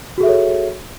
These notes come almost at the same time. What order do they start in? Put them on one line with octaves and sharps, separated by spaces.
F#4 G#4 E5 A4 C#5